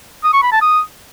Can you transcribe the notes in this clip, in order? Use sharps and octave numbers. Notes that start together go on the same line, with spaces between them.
D#6
C#6
B5
A5
D#6